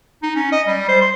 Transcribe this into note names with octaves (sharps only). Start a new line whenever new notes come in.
D#4
C#4
D#5
G3
C5
C6